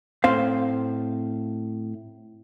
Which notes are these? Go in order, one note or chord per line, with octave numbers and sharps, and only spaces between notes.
A2 C4 C5 F5